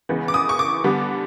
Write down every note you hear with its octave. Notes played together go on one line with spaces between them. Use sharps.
E2 C#3 E3 G#3 B3
D6
D#6
C#6
D6
D3 G3 B3